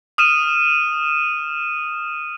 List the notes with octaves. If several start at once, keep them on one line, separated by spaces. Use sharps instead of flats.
D#6 F6 D#7 E7